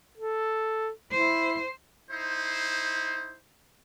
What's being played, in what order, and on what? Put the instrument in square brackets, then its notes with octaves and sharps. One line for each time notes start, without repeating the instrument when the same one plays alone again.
[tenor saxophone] A4
[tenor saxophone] E4 [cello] C5
[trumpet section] D#4 E4 C5